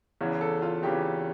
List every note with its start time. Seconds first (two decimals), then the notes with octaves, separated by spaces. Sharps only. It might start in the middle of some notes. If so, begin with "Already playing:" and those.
0.21 E2 C#3 E3
0.41 A4
0.62 F4
0.83 E2 C#3 E3 G4